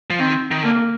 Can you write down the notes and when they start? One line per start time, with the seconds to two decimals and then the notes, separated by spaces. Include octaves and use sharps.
0.10 F3
0.19 D#3 C4
0.51 D#3
0.63 D3 A#3